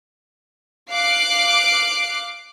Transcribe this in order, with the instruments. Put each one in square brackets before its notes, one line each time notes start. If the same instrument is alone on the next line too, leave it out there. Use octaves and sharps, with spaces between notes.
[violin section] F5 D6 F#6 C7 D7